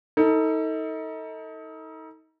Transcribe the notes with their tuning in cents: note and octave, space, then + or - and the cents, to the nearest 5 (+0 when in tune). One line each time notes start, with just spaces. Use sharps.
D#4 +35 A4 +25